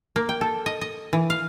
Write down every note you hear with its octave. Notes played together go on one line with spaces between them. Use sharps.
A#3
G5
A4
D#5
D#5
E3
F5